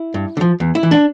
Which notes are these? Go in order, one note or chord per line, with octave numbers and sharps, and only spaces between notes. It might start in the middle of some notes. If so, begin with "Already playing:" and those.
Already playing: E4
G2
D3
F3
E2
E4
E3
D4